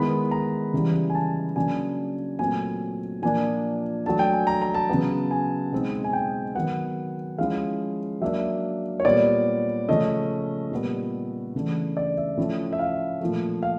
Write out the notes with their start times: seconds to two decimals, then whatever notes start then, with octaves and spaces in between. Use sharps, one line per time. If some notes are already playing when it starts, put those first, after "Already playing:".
Already playing: D#3 G#3 B3 E4 B5
0.31 A#5
0.73 C#3 E3 G3
1.10 G#5
1.15 A5
1.56 C#3 F#3 A#3 D4 G#5
2.39 A#2 F#3 A3 C4 G#5
3.22 A#2 F3 A#3 D4 G#5
4.06 F#3 A3 D4 A5
4.19 G5
4.33 G#5
4.47 A#5
4.62 A#5
4.74 A5
4.90 C#3 F#3 B3
5.31 G#5
5.72 B2 G#3 C4 D#4
6.04 G#5
6.13 G5
6.55 D#3 F#3 B3 F#5
7.38 F3 G#3 C#4 E4 F5
8.21 F#3 A#3 D4 E5
9.00 C#5
9.05 A#2 G3 B3 D5
9.88 C#3 F3 A3 C#4 D#5
10.72 A#2 G3 B3
11.55 C#3 E3 A3 D4
11.97 D5
12.17 E5
12.37 A2 F3 A3 C#4 E4
12.73 E5
12.79 F5
13.21 A#2 F3 A3
13.63 F5